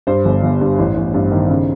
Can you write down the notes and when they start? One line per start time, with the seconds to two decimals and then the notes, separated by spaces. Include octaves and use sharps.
0.07 G2 C5
0.25 G1
0.43 G1
0.61 G2
0.78 A1
0.96 A1
1.14 G2
1.31 D#3
1.49 C#3